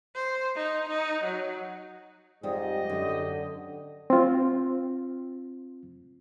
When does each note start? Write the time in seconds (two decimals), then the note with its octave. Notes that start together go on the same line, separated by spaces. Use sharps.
0.15 C5
0.56 D#4
0.89 D#4
1.24 F#3
2.43 F2 G#2 G3 G4 D#5
2.90 F#2 D3
4.10 C4 F4